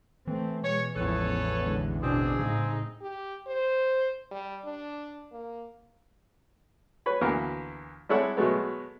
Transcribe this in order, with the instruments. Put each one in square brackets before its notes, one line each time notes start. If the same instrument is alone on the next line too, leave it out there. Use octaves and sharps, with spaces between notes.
[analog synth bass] E3 [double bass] A3 C4
[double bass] B2 G#3 [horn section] C#5
[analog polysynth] A1 E2 [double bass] F3 G#3 [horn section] A4 B4 C#5
[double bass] D3 G#3
[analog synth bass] B2 [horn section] C4 G#4 [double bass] D4
[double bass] A2 D#4 [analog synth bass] C#3
[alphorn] G4
C5
G3
D4
A#3
[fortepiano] B4 C#5 B5
D2 E3 A#3 B3 A#4
G3 G#3 E4 A4 C#5 F#5
B2 F#3 G#3 A3 B3